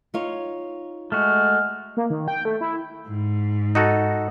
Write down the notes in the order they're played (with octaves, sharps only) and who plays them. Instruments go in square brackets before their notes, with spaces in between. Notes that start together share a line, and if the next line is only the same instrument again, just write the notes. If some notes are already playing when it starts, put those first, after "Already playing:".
[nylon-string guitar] D#4 F4 C#5
[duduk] G#3 [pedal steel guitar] A3 F#4 [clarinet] F6
[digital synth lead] A#3
D#3
G5
A3
E4
[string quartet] G#2
[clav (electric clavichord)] D#4 F#4 A4